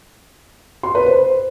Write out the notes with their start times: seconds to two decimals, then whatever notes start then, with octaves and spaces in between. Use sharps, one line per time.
0.83 C6
0.95 B4
1.06 C5